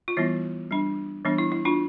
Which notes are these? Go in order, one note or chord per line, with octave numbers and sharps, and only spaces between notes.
F4
E3 G3 B3 E4
G3 D4
E3 G3 B3 D4
E4
E4
D4 F4